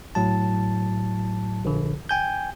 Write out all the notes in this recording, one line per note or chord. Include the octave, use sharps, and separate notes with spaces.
A2 F#3 A5
A#1 D3
G5 G#5 G6